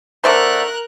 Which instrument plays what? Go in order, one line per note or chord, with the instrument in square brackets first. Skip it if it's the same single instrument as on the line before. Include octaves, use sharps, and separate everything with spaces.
[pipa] D3 A3 C5 [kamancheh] A#4 F#6